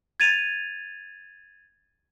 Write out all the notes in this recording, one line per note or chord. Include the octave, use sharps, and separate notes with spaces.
G#6 A6 D#7 F7